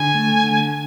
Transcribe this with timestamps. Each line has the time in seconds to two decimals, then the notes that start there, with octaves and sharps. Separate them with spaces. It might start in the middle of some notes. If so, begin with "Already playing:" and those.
Already playing: D3 G#5
0.14 A3
0.44 D3